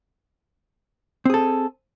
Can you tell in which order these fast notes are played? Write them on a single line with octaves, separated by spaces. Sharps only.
C4 G#4 A4